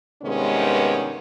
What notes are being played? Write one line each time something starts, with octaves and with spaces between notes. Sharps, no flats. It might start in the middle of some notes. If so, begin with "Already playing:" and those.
G2 C3 D#3 G#3 B3 C#4